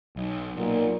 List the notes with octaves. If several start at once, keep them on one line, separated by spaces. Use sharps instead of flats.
B1
B1 A#2